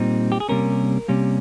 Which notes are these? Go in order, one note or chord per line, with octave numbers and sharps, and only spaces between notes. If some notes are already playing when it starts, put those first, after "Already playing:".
Already playing: A#2 G3 C4 D#4
G4
G#4
C3 G3 A#3 C#4 A#4
C3 G3 A#3 C#4